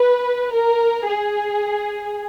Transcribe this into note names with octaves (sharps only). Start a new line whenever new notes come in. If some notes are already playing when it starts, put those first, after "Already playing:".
Already playing: B4
A#4
G#4